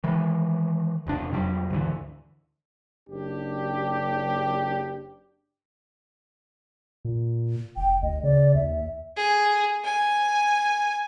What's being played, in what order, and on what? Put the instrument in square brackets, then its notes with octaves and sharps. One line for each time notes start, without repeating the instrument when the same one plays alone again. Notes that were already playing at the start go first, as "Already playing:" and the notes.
[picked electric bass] D#3 E3 G#3
E1 C3 D4
F2 C3 F#3 G3
D2 G#2 D3 E3
[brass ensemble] F#1 D4 G4
[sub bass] A#2
[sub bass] F1 [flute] G5
[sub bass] D2 [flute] D#5
[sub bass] C#3 [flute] D5
[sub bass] D#2 [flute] E5
[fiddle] G#4
G#5